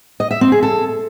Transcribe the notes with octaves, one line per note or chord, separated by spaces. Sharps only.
D#5
E5
C4
G#4
A4